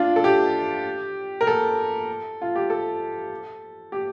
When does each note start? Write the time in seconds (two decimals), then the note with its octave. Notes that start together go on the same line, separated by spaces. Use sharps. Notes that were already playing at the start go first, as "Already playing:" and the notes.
Already playing: D4 F4
0.16 A4
0.24 G4
1.41 A#4
1.47 A4
2.42 F4
2.56 G4
2.70 A4
3.92 G4